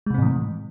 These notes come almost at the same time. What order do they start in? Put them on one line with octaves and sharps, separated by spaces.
G#3 C3 C4 A2 E3